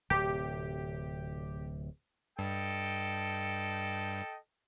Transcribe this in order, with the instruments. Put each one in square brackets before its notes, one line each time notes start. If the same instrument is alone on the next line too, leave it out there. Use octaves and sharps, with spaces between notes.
[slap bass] D1 C3 [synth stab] G4
[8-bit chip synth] G2 [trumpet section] A4 D#5 G5